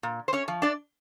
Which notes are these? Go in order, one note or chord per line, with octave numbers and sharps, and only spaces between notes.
A#2
C5
C#4 C#5
F3
D4 D5